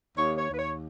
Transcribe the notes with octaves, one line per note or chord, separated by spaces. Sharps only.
D#2 C#5
C#5
D#2 B4
C#5